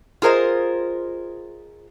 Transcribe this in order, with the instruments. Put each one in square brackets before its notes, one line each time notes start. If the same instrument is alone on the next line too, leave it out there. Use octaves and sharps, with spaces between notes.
[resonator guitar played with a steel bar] F4 G#4 A#4 C5 D#5